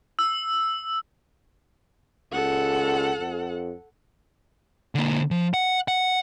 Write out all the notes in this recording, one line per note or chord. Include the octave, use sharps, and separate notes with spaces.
E6
C#2 A4 F#5
F2
D3 A#3
F3
F#5
F#5